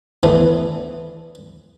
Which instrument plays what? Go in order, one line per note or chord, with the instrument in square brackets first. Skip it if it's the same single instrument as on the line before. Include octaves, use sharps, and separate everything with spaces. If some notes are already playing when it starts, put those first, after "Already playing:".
[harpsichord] E3 A3 B3 D4